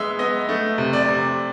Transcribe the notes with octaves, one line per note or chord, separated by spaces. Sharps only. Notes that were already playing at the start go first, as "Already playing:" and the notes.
Already playing: G#3 B3 E5
B3 D#5
A3
C3
D5
C3